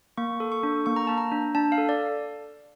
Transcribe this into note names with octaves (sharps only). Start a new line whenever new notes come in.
A#3 C#6
A4
C#6
D4
A#3 C#6
A#5
A#3 A5
A#5
D4
D4 A5
F5
A4
D5